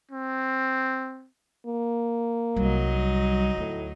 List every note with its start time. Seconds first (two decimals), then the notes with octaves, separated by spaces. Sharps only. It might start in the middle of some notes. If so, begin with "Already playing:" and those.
0.12 C4
1.66 A#3
2.56 C2 F#3 G3 D#4
3.58 D2 A2